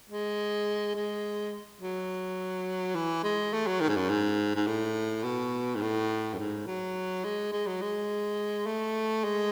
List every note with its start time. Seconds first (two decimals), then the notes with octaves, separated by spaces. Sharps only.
0.10 G#3
0.95 G#3
1.81 F#3
2.95 E3
3.24 G#3
3.53 A3
3.66 F#3
3.80 D#3
3.88 G#2
3.96 F#2
4.09 G#2
4.55 G#2
4.67 A2
5.24 B2
5.75 G#2
5.81 A2
6.33 F#2
6.38 G#2
6.66 F#3
7.24 G#3
7.52 G#3
7.67 F#3
7.81 G#3
8.66 A3
9.24 G#3